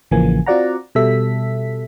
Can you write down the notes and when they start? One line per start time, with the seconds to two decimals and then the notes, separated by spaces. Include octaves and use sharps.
0.11 A1 C#3 E3 F3 A#3 G#5
0.46 C4 F4 F#4 D5 F#5 A#5
0.95 B2 G3 A4 E5 B6